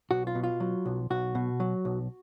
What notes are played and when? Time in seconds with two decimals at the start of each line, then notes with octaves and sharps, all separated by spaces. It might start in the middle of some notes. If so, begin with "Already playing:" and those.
0.11 B1 F#4
0.27 F4
0.35 B2
0.44 F4
0.60 F#3
0.85 B1
1.10 B1 F#4
1.35 B2
1.60 F#3
1.85 B1